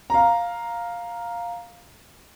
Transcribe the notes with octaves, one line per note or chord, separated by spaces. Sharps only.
F5 A#5